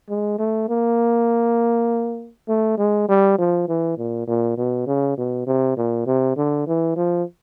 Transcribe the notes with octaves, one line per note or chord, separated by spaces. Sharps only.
G#3
A3
A#3
A3
G#3
G3
F3
E3
A#2
A#2
B2
C#3
B2
C3
A#2
C3
D3
E3
F3